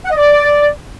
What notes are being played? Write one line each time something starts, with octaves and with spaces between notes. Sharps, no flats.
F#5
D#5
D5